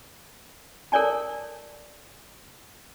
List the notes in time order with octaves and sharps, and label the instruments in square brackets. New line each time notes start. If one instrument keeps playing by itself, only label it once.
[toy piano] A4 A#4 C#5 D5 G#5 A5